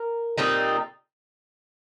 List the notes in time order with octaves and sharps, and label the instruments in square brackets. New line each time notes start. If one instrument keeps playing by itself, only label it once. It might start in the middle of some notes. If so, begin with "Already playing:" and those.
Already playing: [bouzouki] A#4
A#2 G3 C4 D#4